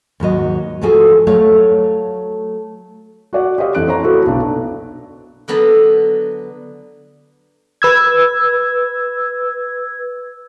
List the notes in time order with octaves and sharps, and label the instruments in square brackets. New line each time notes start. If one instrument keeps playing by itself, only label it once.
[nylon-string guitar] D#2 G#2 F#3 D#5
D2 G#2 F3 F#4 G#4 A4
F#3 A3 C#5 F5
[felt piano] F#4 D5 F#5
G4 C5 C#5 D#5 F5
F2 E3 F#6 D7
C5 C#5 A#5
A3 E4 F#4 A4 B4
B1 D4
[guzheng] D3 F#3 B3 D#5 A5
[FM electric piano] B4 E6 G#6